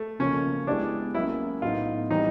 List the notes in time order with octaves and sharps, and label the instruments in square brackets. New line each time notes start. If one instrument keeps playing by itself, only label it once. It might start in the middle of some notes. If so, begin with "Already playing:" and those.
Already playing: [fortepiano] A3
[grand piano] C#3 F3 A#3 [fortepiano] C#4
[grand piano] G#3 B3 E4 G4 [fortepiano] D4
[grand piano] F#3 A#3 C#4 [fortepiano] E4
[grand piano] A2 F#3 B3 D#4 [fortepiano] F4
[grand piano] E3 G3 C4 [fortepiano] D#4